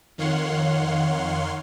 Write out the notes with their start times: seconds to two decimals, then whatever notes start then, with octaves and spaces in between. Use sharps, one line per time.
0.18 F2 D#3 C#5 F5 F#5 C6